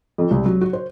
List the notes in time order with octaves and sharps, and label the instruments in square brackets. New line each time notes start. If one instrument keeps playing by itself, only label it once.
[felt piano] F2
C2
F#3
F#4
C5